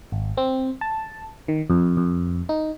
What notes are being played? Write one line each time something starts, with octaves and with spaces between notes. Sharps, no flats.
G#1
C4
A5
D#3
F2
F2
D#4